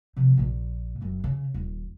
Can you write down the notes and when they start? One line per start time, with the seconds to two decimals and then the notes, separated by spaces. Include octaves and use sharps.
0.16 C3 F3
0.37 A#1 A#2
1.01 F#1 F#2
1.24 C#3
1.54 D#1